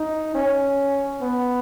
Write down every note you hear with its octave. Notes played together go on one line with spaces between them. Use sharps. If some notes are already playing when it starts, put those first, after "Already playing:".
Already playing: D#4
C#4
B3